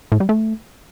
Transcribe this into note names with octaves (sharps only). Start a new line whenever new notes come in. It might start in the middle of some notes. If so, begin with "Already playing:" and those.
A2
G3
A3